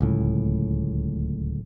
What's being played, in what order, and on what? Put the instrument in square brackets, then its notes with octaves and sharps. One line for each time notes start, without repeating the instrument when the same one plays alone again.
[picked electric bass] D1 C#2 A2